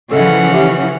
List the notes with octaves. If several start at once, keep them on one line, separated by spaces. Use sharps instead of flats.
C#3 E3 F3 C#4 A4 D#5 E5 F#5
G4 E5